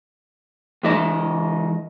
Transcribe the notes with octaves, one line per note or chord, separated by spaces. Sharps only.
C#2 E3 D#5 A5